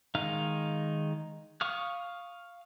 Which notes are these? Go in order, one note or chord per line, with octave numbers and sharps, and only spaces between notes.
D#3 G#3 D#4 F5 F6
F5 C#6 D#6 F6